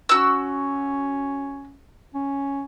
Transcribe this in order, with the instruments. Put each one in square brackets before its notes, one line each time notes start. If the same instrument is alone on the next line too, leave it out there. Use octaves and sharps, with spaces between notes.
[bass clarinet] C#4 [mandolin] F#4 E6
[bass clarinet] C#4